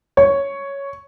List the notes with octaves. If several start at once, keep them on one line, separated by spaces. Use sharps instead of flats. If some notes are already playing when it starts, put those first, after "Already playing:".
C#5